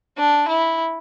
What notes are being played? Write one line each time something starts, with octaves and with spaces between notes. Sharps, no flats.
D4
E4